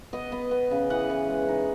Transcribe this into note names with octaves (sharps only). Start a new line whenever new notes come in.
B3 D#5
B3
B3
C#3
E3 F#5
E3
G#3
D#4